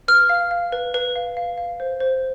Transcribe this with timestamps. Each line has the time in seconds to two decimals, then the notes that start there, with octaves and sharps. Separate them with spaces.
0.08 B4 F6
0.29 F5
0.51 F5
0.72 B4
0.94 B4
1.16 F5
1.37 F5
1.58 F5
1.80 C5
2.00 C5